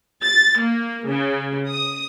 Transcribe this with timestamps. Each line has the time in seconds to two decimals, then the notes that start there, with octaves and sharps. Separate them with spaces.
0.24 A6
0.61 A#3
1.07 C#3
1.69 D#6